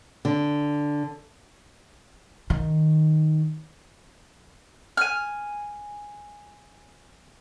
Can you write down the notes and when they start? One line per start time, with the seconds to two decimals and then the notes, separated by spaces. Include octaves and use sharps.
0.25 D3
2.50 D#3
4.97 G#5 F6